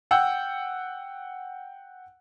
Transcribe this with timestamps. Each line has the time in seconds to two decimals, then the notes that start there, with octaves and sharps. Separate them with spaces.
0.11 F#5 G5 E6 G6